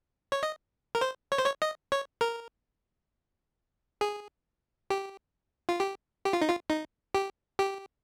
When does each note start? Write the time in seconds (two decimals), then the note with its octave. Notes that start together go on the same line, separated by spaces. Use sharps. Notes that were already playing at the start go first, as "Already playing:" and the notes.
0.32 C#5
0.43 D#5
0.95 A#4
1.01 C5
1.32 C#5
1.38 C5
1.46 C#5
1.62 D#5
1.92 C#5
2.21 A#4
4.01 G#4
4.90 G4
5.69 F4
5.80 G4
6.25 G4
6.33 F4
6.41 D#4
6.49 F4
6.70 D#4
7.15 G4
7.59 G4